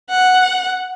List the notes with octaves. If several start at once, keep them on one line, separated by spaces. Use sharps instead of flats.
F#5